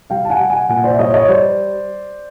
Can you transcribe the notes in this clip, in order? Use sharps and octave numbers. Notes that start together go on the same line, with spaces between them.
G3 F5 G5
A5
F#5 G#5
G3
F#5 G#5
A#2 F#5 G#5
C5 D5
E5
G3 C#5 D#5
C#5 D#5
G3 C5 D5